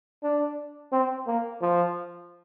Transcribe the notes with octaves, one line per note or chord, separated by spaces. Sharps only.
D4
C4
A#3
F3